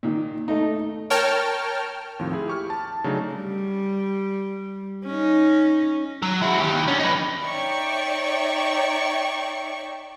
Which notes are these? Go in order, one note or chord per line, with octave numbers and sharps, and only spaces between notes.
A#2 D#3
A3 D#4
A#4 C#5 G5 A5 F6
D#2 A2 F3 C4
E4 G#4
G4 C#6 F6
A5
C#3 F#3 A3 D4 D#4 A4
G3
C#4 D#4
F#3
E4 F#4
D#3 G4
D3 C#4
D#4 B4
D#4 C#5 D5 E5 G5 C#6